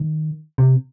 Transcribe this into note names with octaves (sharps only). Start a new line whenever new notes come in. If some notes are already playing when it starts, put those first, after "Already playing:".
Already playing: D#3
C3